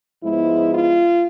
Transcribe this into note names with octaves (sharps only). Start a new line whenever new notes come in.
G#2 F3 G#3 B3 E4
F4